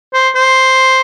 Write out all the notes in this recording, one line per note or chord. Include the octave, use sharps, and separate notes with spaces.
C5
C5